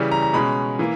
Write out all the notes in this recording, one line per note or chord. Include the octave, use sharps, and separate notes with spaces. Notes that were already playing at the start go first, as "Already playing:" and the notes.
Already playing: C#3 E3 G3
A#5
A#5
B2 G#3 C#4 B5
E3 A#3